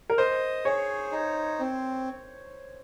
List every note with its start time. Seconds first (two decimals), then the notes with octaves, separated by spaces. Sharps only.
0.10 A#4
0.18 C5 D#5
0.65 G#4 C#5
1.12 D#4
1.60 C4